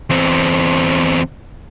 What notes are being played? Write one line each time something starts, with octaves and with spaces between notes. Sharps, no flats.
E2 C4